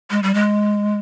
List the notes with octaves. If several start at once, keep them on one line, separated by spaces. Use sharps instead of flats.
G#3
G3
G#3